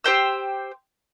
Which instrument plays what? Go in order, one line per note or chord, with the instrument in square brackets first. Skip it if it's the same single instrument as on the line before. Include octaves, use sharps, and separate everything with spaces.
[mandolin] G4 C5 G5 E6